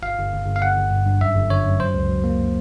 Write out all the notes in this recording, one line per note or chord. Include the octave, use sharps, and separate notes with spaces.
G1 F5
G1
G1
G1
F5
G1 F#5
G1
G2
G2
F#2 E5
G1
D3 C#5
F#2
F#3 C5
C#2
F#3
A#3